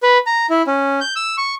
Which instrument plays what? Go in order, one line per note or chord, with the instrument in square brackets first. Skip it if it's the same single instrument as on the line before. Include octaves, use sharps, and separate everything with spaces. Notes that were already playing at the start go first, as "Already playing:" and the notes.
[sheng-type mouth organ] B4
A#5
E4
C#4
G6
E6
C#6